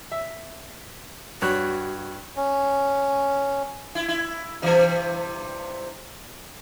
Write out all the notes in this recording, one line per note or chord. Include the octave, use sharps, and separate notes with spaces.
E5
G2 F#4 C#5 F#6
C#4
E4
E4
G2 C3 E3